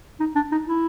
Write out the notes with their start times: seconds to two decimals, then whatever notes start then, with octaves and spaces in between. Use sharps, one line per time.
0.20 D#4
0.35 D4
0.52 D#4
0.68 E4